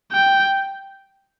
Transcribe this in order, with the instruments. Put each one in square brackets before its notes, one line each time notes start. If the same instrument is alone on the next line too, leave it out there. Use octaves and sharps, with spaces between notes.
[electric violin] G5